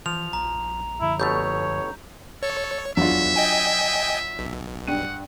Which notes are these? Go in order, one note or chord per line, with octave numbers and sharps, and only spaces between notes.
E3 F3 F7
A#1 A#5
F#2 D3 F3 E4
G1 B2 A3 C#5 G6
A4 C#5
E2 F#3 D4 F4 E5
D#5 G5 G#5
B1
G2 F#5 G5 D#7